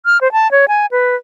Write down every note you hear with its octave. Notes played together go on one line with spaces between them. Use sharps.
F6
C5
A5
C#5
G#5
B4